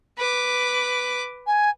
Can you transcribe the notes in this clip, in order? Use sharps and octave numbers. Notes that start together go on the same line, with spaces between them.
B4 D6
G#5